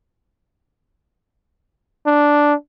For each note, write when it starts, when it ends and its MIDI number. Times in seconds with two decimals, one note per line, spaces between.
2.06 2.54 62